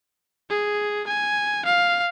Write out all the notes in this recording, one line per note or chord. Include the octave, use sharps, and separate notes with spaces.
G#4
G#5
F5